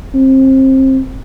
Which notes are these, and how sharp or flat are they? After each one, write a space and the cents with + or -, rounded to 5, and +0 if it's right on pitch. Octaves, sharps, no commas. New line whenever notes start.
C4 +25